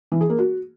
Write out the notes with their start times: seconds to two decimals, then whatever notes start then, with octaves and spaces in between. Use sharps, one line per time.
0.12 E3
0.21 G#4
0.30 A#3
0.39 F#4